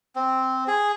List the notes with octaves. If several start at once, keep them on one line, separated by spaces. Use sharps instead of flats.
C4
G#4